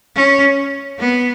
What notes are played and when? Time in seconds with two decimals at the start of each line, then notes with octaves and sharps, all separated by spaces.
0.16 C#4
0.99 B3